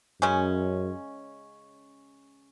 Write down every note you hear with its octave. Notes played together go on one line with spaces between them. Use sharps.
F#2 C#3 G#3 C#4